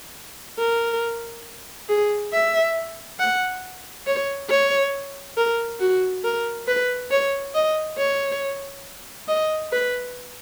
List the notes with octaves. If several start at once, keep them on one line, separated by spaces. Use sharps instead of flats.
A#4
G#4
E5
F#5
C#5
C#5
A#4
F#4
A#4
B4
C#5
D#5
C#5
D#5
B4